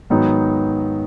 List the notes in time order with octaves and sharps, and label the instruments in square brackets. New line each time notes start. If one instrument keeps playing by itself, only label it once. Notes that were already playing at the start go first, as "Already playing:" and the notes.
[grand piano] G#2 D#3 F#3 B3 D#4